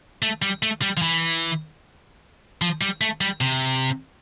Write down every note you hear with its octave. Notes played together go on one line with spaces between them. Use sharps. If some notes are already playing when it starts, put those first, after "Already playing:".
A3
G3
A3
G3
F3
E3
F3
G3
A3
G3
C3